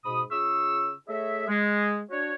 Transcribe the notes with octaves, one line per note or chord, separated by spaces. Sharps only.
G#2 B2 B5 D#6
C#3 F4 G#4 C#6 E6
A3 G#4 C#5 D#5 E5
G#3
D4 F#4 C#5